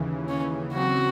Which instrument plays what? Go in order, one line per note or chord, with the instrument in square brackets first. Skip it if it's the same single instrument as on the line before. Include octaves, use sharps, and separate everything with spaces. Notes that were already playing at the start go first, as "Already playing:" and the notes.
Already playing: [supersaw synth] D#2 C#3 E3
[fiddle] C#4
[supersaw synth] C#3 F#3 C4 [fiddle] F#4